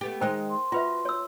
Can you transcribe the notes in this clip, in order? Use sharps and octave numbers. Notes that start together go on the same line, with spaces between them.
A3 B3 G4
D#3 G#3 A#4 C5 D#5 G5
C6
F4 F#4 B4 E5
C#5 E6